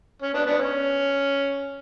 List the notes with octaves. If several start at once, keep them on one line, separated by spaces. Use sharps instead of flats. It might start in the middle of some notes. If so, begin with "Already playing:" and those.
C#4
B3 D4
B3 D4
C#4